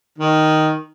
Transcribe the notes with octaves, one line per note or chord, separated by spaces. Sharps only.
D#3